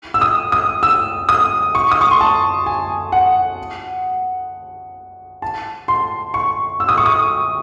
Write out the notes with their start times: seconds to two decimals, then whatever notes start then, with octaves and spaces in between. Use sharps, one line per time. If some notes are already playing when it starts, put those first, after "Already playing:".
0.14 E6
0.21 D#6
0.52 D#6
0.83 E6
1.29 D#6
1.75 C#6
1.91 D#6
2.01 C#6
2.11 C6
2.21 A5
2.66 G#5
3.12 F#5
5.42 A5
5.88 C6
6.34 C#6
6.80 E6
6.89 D#6
6.97 C#6
7.06 D#6